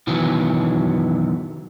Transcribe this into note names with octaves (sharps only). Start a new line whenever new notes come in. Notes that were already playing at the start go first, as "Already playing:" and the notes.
B2 D#3 E3 F#3